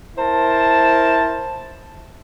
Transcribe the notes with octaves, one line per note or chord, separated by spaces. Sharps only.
E4 A#4 C5 A5